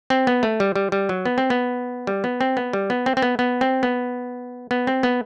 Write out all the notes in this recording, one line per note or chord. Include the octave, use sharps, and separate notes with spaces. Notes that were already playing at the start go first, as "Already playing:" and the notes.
C4
B3
A3
G3
G3
G3
F#3
B3
C4
B3
G3
B3
C4
B3
G3
B3
C4
C4
B3
B3
C4
B3
B3
C4
B3